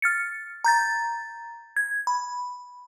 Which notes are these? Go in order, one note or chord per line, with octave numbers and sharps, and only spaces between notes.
F6 A6 C#7
A#5 G6 A6
G#6
B5